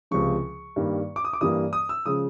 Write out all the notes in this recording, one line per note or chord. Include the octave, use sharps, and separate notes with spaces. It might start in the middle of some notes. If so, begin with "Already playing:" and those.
C#2 C3 F3 G#3 C#6
G2 D#3 G3 A#3
D6
D#6
D6
G2 E3 G3 A#3 D#6
D#6
E6
C#3 F3 G#3 D#6